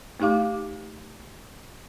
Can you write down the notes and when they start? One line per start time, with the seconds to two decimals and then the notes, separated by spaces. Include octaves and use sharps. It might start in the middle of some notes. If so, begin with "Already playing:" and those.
0.20 A3 D#4 G4 F5 D6